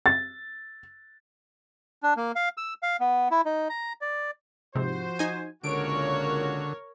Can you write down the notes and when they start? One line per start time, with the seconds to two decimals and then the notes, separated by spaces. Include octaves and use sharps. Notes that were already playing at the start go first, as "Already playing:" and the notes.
0.06 A6
2.03 D4
2.17 A#3
2.36 F5
2.57 E6
2.83 F5
3.00 B3
3.31 E4
3.45 D#4
3.70 A#5
4.01 D5
4.75 G#2 C3 F3 F#4 C5
5.19 D#4 G#5
5.64 C#2 A#2 D3 F#4 A#4 C#5 D7